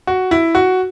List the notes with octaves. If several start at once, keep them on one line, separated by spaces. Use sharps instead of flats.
F#4
E4
F#4